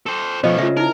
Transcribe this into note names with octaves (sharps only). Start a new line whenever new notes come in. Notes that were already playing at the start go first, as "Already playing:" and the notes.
A4 C5
B2 F3 A3 C#4 C5 D#5
C#3 F4 E5
D#4 E4 A#4